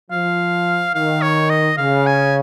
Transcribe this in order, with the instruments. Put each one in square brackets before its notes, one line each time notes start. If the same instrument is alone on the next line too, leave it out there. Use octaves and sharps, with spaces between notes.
[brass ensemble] F3 [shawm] F5
[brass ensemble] D#3 [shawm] F5
[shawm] C#5
D#5
[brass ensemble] C#3 [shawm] F5
[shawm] G#5